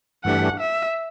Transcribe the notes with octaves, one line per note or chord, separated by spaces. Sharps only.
G2 E3 A3 D4 G4 F#5
E5